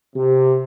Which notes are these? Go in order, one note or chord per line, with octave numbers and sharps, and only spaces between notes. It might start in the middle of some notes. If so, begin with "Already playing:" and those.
C3